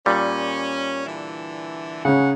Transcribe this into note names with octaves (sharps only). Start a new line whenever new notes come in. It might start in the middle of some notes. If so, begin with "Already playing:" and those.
A#2 G3 C#4
D3 E3
C#3 C#4 D#4 G#4 F#5